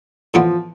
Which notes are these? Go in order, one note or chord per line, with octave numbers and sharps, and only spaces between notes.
A2 E3 F3 B3 D4 F4